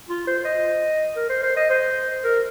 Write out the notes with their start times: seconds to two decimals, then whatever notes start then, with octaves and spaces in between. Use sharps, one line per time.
0.09 F4
0.27 C5
0.45 D#5
1.16 A#4
1.30 C5
1.43 C5
1.57 D#5
1.70 C5
2.24 A#4